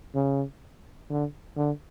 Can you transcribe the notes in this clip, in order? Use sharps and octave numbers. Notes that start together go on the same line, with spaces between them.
C#3
D3
D3